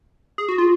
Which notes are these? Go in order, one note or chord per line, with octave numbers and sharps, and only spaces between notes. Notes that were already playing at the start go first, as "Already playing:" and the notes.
G#4
F#4
F4